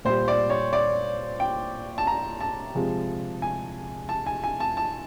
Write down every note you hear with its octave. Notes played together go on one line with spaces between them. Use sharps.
A#2 G3 C5
D5
C#5
D5
G5
A5
A#5
A5
C3 F3 G#3
G#5
A5
G#5
G#5
A5
A5